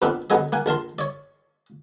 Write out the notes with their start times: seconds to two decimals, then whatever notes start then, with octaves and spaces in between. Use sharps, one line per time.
0.02 F2 A#2 B3 C4 D4
0.30 F#2 D3 B3 G#4 D#5
0.52 A#3 F#5 G#5
0.66 A#1 A#4 A5 C6
0.99 C#5 D5